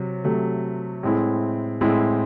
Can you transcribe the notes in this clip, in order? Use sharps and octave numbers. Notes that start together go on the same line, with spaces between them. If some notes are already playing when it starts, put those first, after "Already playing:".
Already playing: C3 F#3
C3 F#3 A3
A2 G#3 C4 E4
A2 G#3 C4 E4